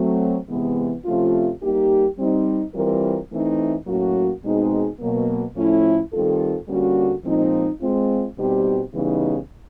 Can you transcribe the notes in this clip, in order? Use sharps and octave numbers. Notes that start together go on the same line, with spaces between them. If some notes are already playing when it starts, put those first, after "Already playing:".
Already playing: F#3 A3 C4
C3 E3 G#3 B3
C3 F3 A3 C#4 F4
G3 A#3 D#4 G4
G3 C4 D#4
E3 G3 C4 F4 A#4
E3 A3 C4 D#4
A2 F#3 A#3 C#4 F#4
B2 G#3 C4 D#4 G#4
B2 F#3 A#3
A2 F3 A3 C#4 E4
D#3 G3 C4 F4 A4
D3 G3 A#3 C#4 F#4
A#2 F3 G#3 C4 D#4
G#3 C4 F4
B2 G3 C4 D#4 G4
C#3 E3 G3 B3 D#4